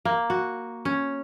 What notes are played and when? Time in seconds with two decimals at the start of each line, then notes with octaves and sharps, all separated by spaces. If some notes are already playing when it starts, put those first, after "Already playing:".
0.05 A#3
0.30 F#4
0.85 C#4